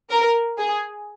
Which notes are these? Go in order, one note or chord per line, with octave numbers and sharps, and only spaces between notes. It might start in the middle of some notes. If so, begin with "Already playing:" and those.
A#4
G#4